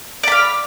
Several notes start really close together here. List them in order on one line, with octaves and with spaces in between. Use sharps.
D5 B5 F5